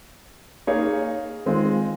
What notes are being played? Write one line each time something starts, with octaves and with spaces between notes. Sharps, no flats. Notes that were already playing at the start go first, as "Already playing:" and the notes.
A#3 D#4 G#4 C#5
D#3 G#3 C4 F4